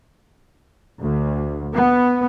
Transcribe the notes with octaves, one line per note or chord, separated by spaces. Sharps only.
D2
B3